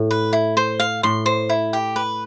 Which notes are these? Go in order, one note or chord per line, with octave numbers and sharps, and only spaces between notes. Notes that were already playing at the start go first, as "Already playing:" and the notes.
Already playing: A2
B4
E4
C5
F5
A2 C6
C5
E4
G4
B4